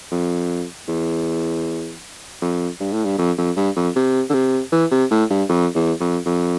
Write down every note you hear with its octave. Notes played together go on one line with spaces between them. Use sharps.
F2
E2
F2
G2
A2
G2
F2
F2
G2
F2
C3
D3
C3
E3
C3
A2
G2
F2
E2
F2
F2